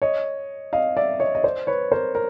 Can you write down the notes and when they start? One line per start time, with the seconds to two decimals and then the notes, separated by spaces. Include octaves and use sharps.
0.02 C#5 D#5
0.73 D#5 F5
0.97 D5 E5
1.20 C#5 D#5
1.35 D#5
1.43 C5 D5
1.67 B4 C#5
1.92 A#4 C5
2.15 A#4